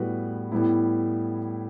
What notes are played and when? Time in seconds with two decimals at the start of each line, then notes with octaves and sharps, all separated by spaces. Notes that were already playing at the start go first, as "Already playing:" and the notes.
Already playing: A2 G3 B3 F#4 B4
0.52 A2 G3 B3 E4